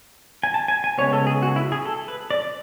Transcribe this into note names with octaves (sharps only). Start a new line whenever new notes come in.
G#5
A5
G#5
G#5
C#3 G#3 B3 C#5
A4
G#4
F#4
E4
G#4
A4
B4
D5